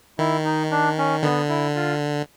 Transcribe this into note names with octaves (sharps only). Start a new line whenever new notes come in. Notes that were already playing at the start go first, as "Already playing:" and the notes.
D#3 E4
D#4
D4
C#4
D3 B3
E4
F4